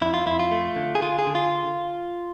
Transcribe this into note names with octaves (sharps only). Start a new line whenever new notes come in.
F2 E4
F4
F2 E4
F4
A3
D3
G#4
D3 F4
G#4
D3
F4